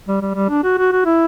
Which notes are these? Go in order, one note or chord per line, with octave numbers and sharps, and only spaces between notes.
G3
G3
G3
D4
F#4
F#4
F#4
E4